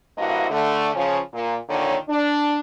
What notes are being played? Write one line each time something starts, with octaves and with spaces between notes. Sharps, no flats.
G2 A#3 E4 F#4 C5 D#5
D3 A3
C#3 F3 C#4
A#2
A#2 D3 D#3 C#5
D4